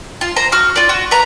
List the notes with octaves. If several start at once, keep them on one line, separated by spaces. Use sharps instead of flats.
F4
C5 A#5
F#4 F6
F4 D5
F#4
B4 A#5